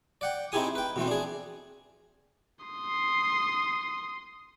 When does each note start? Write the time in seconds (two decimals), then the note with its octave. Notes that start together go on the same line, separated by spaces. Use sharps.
0.21 D5 F#5 G5
0.52 C4 D#4 E4 G4 G#4 D#6
0.75 B4 G5
0.96 B2 E3 A3 C4
1.07 D4 G#4
2.65 C6 D#6